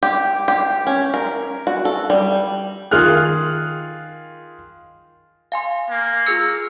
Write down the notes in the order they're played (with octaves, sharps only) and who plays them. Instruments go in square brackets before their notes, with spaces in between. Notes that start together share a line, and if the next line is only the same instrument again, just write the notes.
[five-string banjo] G4
G4
C#4
A#4
F#4
A4
G3
[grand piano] D#3 F4 G#4 F6 F#6
[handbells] F5 G#5 C6
[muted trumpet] A#3
[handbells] F4 G#4 C#7 [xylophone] E6 A#6